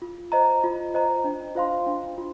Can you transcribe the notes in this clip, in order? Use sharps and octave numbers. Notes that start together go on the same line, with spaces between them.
F4
C5 D#5 A#5
F4
C5 D#5 A#5
D4
F4 C5 F5 C6
D4
F4